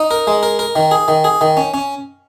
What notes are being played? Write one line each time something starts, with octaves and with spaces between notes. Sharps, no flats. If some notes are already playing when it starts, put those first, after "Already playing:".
Already playing: D#4
A#4
G#3
A#4
A#4
D#3
G#4
D#3
G#4
D#3
C#4
C#4